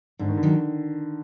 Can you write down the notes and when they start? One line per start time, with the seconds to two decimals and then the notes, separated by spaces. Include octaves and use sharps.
0.19 G#2 D3
0.29 D#3
0.37 D3
0.43 D#3 F#3